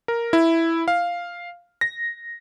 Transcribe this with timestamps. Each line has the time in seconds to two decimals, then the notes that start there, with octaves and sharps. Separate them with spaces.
0.08 A#4
0.33 E4
0.88 F5
1.81 A#6